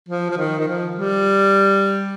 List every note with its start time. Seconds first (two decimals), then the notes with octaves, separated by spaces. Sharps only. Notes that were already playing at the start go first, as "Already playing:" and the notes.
0.09 F3
0.30 F3
0.37 D#3
0.59 D#3
0.67 F3
0.96 G3